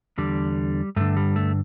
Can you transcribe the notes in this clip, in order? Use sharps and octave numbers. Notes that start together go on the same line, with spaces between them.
E2 D3 G3
G2 D3 A3
G3
A3